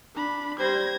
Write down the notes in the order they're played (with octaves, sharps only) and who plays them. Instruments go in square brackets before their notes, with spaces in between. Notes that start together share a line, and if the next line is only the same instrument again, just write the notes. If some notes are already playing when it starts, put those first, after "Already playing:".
[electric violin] D4 B5
[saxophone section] G3 C5 [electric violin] G#6 A#6